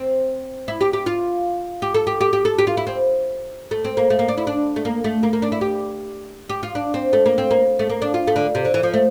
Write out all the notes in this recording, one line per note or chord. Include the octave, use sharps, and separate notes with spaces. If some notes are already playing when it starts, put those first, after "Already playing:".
Already playing: C4
E4
G4
G4
F4
G4
A4
G4
G4
G4
A4
G4
F4
E4
C4
A3
C4
A#3
A3
A#3
D4
E4
D4
A3
A#3
A3
A#3
A#3
D4
E4
G4
G4
F4
D4
C4
A3
A#3
C4
A#3
A3
A#3
D4
F4
A3
D3
C3
D3
E3
F3
A3